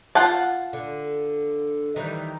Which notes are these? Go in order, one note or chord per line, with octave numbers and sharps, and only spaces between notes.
F4 F#5 A5
D3
D#3 E3 G3